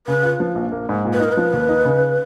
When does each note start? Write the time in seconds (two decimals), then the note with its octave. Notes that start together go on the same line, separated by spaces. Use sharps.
0.07 C#3 B4
0.23 F4
0.40 F3
0.55 A#1
0.72 A#3
0.89 G#2
1.05 A#2
1.13 B4
1.20 D#4 A#4
1.32 F3 B4
1.53 D#2
1.69 D#4
1.85 C#3